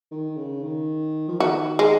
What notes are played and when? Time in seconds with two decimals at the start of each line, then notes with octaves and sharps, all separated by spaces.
0.11 D#3
0.37 C#3
0.63 D#3
1.28 F3
1.40 D#3 F#4
1.79 G#3